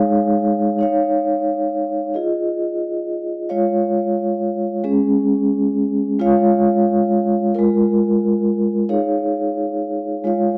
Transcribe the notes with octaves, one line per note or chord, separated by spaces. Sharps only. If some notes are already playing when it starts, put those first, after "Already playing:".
Already playing: G#3 D#4 G#4 C#5 F5
D#4 C#5 F5
F4 G#4 D#5
G#3 F4 C#5 F5
G#3 C#4 G#4
G#3 F4 C#5 F5
G#3 F4 A#4
D#4 G#4 C#5 F5
G#3 F4 C#5 F5